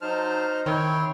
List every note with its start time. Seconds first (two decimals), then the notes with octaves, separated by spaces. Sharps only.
0.01 F#3 D#4 C5 A5 F6
0.66 D#3 C4 E4 C#5 G5 C6